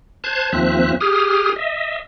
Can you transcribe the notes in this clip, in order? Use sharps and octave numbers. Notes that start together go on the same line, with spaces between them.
C5 A5 F#6 G#6
D#2 F3 C4 E5 F#6
G4 G#4 D#6 F6
D#5 E5